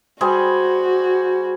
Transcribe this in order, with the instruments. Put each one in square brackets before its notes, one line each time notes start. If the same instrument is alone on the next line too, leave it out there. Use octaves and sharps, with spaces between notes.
[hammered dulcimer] G3 G#4 C5 [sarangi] F#4